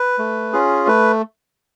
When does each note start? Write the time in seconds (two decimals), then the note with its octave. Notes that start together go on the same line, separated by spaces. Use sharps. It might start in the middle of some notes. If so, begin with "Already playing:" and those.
Already playing: B4
0.19 A3
0.53 C#4 F4 G#4
0.87 A3 B4